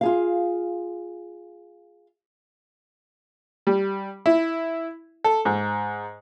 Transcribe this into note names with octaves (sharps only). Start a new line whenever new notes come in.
F4 G#4 F5
G3
E4
A4
G#2